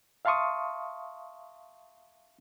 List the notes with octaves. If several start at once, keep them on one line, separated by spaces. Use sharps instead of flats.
E5 F5 A5 C6 C#6 D#6